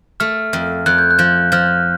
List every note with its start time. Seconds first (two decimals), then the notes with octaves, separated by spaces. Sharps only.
0.20 A3 F6
0.53 F2
0.86 F2 F#6
0.98 G6
1.11 F#6
1.19 F3
1.52 F3 F6